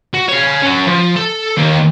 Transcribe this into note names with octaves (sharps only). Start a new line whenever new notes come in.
F#4
C#5 F5
C#4 F#4
F3
A4
D#3 A#3